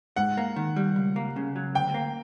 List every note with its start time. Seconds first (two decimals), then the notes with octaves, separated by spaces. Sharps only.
0.16 G#2 F#5
0.37 A#3
0.56 D#3
0.76 G3
0.96 C#2
1.16 A#3
1.36 C#3
1.56 F#3
1.75 D2 G5
1.94 A#3